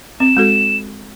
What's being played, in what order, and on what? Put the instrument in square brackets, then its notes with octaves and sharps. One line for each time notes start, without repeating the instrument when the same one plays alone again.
[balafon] C4 [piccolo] E7
[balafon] G#3 F#4 A4